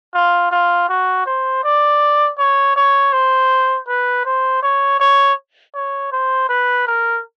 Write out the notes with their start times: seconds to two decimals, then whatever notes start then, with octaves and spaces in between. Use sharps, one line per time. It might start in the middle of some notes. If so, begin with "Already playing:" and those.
0.14 F4
0.51 F4
0.89 F#4
1.26 C5
1.64 D5
2.38 C#5
2.76 C#5
3.13 C5
3.88 B4
4.25 C5
4.63 C#5
5.00 C#5
5.74 C#5
6.12 C5
6.49 B4
6.87 A#4